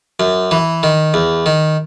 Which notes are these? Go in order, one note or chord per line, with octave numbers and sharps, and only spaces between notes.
F#2
E3
D#3
E2
D#3